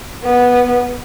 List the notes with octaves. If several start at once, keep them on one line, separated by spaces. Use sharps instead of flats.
B3